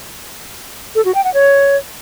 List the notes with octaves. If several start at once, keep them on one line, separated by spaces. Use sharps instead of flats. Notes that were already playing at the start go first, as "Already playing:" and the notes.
A4
F#4
G5
F#5
C#5